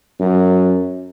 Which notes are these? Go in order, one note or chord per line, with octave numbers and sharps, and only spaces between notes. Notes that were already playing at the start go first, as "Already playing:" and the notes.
F#2